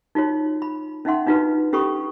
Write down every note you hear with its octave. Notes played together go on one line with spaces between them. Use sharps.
D#4 F4 F#4 C#5
B5
C#4 D#4 E5 F#5 C6
D4 D#4 F4 F#4 B4
C#4 G4 A4 B5 C#6 D#6